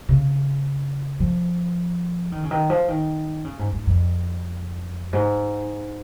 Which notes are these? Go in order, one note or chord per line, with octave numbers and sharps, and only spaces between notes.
C#3
F3
D#3
C#3
D#3
F3
D#3
C#3
G#2
G#2
F2
G#2